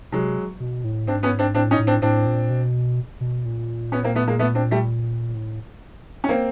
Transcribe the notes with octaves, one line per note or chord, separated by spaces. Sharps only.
C3 F#3 G#3
B2
A2
G#2 C4 D4
B3 C#4
C4 D4
A2 C4 D4
C#4 D#4
A2
C4 D4
A2 C4 D4
A#2
B2
B2
A#2
B3 C#4
A#3 C4
A3 B3
G#3 A#3
A3 B3
C4 D4
G3 A3
A2
C#4
A#3 C4